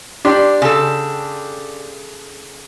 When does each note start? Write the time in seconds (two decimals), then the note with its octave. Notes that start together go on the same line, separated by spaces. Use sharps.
0.25 D4 G4 D5 C6
0.62 C#3 A4